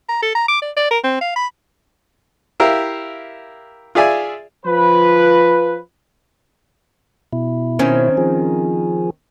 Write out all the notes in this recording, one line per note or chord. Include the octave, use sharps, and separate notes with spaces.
A#5
A4
A#5
D6
D5
D5
A#4
C4
F5
B5
E4 G4 A#4 E5 F5
F4 G#4 D5 E5 G#5
F3 B4
B2 E4
D#3 C4 C#4
F3 G#4